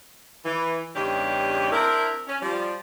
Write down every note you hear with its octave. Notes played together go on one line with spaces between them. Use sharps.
E3
E2 G2 C#3 D4 D#4 G4
C4 D4 E4 A#4
C#4
F3 G3 D5